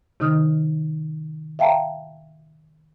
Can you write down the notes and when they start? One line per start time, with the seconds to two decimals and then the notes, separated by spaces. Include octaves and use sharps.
0.20 C3 D#3 D#4 D#6 F6
1.59 E5 F5 G5 A5 A#5